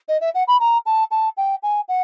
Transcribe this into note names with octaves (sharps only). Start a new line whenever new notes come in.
D#5
E5
F#5
B5
A#5
A5
A5
G5
G#5
F#5